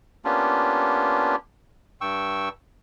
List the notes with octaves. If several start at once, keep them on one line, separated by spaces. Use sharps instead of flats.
A#3 B3 C#4 D4 F4 G4
G2 G5 C#6 E6